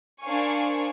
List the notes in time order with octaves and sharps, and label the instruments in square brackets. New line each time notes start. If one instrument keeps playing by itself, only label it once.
[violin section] D4 A#4 C5 F5 G#5 C#6